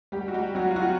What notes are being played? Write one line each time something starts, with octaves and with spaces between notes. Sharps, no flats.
G3 G4
F#4
G3 G4
F#3 F#4
F4
F#3 F#4